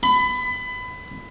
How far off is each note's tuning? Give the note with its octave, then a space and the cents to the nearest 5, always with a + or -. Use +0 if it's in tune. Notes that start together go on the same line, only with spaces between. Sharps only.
B5 +25